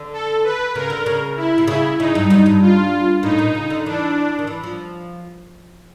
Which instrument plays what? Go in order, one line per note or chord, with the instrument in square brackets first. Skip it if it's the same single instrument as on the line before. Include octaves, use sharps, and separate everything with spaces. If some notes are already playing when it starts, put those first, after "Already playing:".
Already playing: [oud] D3
[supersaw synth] A4
B4
[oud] C#3 [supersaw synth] A#4
[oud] D3
C#3
[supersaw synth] E4
[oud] C3
[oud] C#3 [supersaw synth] E4
[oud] C#3 [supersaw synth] D#4
[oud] G2
F#2
G2
[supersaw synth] F4
[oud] A2 [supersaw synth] D#4
[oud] A#2
C#3
D3
[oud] E3 [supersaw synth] D4
[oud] D#3
E3
F3